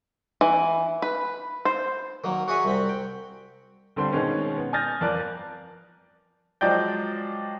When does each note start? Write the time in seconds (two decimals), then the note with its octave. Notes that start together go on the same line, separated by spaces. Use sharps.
0.41 E3
1.02 B4
1.65 C5
2.24 D#3 F#3 A#3
2.48 F#4 G#4 C#5 E5 F#5 G#5
2.65 C2 C4 B5
2.89 G5
3.96 G1 D3 G3 C4 C6
4.13 B2 D#3 G#3 C4 C#4
4.57 B3
4.73 G#5 D#6 F6 G6 A6 A#6
5.01 G1 F2 A#4 D5 F#6
6.61 F3 F#3 G#3 D5 G5 G6